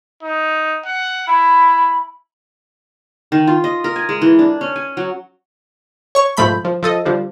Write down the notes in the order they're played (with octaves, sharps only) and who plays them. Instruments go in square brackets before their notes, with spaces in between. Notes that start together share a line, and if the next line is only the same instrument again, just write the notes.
[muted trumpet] D#4
F#5
[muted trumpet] E4 [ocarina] B5
[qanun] D#3
F4
D#5
A#4
G#5
G#3
E3
D4
C#4
G#5
F#3
[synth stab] C#5 C#6
B1 G#2 F3 A3 B5 G6
F3
F3 A4 D#5
D3 F3 G3